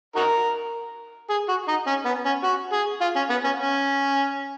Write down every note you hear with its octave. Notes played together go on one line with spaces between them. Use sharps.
D#4 F#4 A#4
G#4
F#4
D#4
C#4
B3
C#4
F#4
G#4
F4
C#4
B3
C#4
C#4